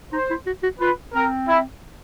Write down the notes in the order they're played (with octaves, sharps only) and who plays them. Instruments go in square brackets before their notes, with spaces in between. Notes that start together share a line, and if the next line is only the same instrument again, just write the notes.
[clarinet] D#4 [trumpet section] C5
[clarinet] E4
F#4
F#4
[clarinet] F4 [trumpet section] B4
[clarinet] C4 [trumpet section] A#4
[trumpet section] E4